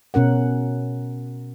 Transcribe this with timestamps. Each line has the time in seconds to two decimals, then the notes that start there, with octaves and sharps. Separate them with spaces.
0.14 B2 C#4 A#4 F#5